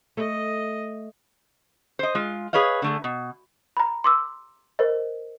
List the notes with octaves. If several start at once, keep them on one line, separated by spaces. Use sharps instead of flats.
A3 D#5
C5 D#5
G#3 F4
G#4 B4 C#5 D#5 F5
D3 A3 G#4
B2
A#5 B5
C6 D6 E6
A#4 C5 D#5